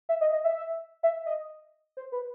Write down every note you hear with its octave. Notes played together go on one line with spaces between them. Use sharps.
E5
D#5
D#5
E5
E5
D#5
C5
B4